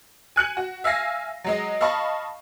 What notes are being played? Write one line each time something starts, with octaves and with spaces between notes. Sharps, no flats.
G#5 F#6 C#7 F#7
F#4
E5 F5 G#5 A#6 C7
F#3 G#3 D#5
D#5 F5 A5 B5 C#6